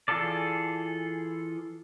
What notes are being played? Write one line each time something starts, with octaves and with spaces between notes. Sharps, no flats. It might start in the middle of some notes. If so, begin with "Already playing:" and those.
E3 F4 G#4 A4 D5